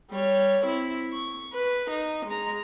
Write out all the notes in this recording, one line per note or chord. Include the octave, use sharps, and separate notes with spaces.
G3 C#5
C4 E4
C#6
B4
D#4
G#3 A#5